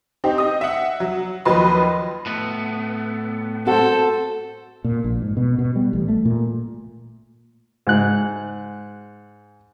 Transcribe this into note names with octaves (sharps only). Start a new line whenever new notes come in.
C4 D#4 G4
D#5 D#6
E5 F#5
F#3
D#2 F3 F#3 B4 D#5 C6
A2 B3
C4 F#4 A4 C5 F#5
A#2
A#1
G#2
B2
B2
G3
A1
A3
A#2
G#2 F#6